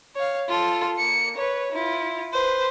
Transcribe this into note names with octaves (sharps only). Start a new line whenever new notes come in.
C#5 F5
F4 A4
A#3 C#7
B4 C#5
E4 F4
B4 C5